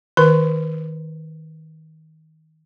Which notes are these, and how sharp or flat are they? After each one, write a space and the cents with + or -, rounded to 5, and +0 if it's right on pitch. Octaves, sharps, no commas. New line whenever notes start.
D#3 +20 B4 -40 B5 +45